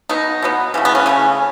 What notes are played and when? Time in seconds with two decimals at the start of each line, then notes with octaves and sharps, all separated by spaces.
0.09 B2 F#3 B3 D#4
0.42 B2 F#3 B3
0.74 C#3 E3 A3
0.85 B3
0.95 C#4
1.06 C#3 E3 A3